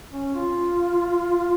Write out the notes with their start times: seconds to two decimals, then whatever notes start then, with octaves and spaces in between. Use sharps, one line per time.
0.13 C#4
0.35 F4